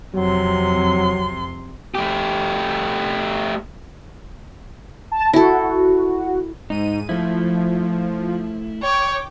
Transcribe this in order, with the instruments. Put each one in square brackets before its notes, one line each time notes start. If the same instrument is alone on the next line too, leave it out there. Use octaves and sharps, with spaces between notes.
[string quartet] F2 C3 C6 [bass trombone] F#3
[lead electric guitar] A3 G4
[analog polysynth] A5
[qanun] E4 A4 [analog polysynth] F#4
[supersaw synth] G#2 D#7 [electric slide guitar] D#4
[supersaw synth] F3 [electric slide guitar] A3 E4
[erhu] C#5 [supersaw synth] G5 D6